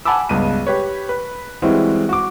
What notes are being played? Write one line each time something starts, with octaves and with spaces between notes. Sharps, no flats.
F#5 G#5 A5 B5 D6 E6
C#2 G2 B3 D#7
G4 B4 C#5
B4
E3 G3 G#3 C4 E4 F#4
F#4 D6